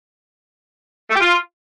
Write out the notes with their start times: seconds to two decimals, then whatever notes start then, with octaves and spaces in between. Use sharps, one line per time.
1.09 A3
1.15 G4
1.21 F4